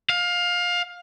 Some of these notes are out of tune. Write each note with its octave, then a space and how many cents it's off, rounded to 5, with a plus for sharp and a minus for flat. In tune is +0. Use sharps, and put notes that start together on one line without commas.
F5 +20